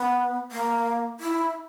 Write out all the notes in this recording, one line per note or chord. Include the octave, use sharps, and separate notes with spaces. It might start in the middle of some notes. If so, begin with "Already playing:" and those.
Already playing: B3
A#3
E4